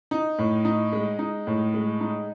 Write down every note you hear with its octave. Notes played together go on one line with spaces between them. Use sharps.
D#4
A2
D#4
G#3
D#4
A2
G#3
D#4